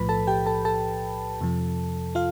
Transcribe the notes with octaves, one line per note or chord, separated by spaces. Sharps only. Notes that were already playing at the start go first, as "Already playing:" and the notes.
Already playing: B1 A2 F3 B4 B5
A4 A5
G4 G5
A4 A5
A4 A5
F2 C3 F3
F4 F5